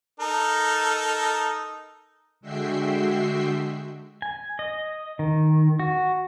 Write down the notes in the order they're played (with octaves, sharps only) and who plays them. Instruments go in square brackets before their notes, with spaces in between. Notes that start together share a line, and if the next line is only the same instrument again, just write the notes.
[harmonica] D#4 A4 A#4
[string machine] D3 G#3 F#4 E5 G5 C7
[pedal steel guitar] G#5
D#5
D#3
F#4